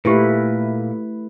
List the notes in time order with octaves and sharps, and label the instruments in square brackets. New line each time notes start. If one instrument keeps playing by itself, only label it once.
[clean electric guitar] A#2 [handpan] A3 E4 B4 [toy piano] G4 C5